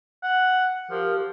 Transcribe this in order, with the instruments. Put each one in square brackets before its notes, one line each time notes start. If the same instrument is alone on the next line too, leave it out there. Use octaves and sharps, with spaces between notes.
[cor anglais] F#5
[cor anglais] F3 [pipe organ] G4 A#4